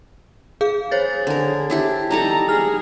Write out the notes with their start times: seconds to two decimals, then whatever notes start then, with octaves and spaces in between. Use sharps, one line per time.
0.61 G#4 F5
0.91 G#4 C5 C#5 A6
1.27 D3 A#4
1.70 D4 E4 G4
2.11 G3 D#4 A4 A#5
2.49 G#4 F6